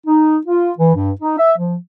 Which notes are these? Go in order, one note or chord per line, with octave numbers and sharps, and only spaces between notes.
D#4
F4
E3
G2
D#4
E5
F3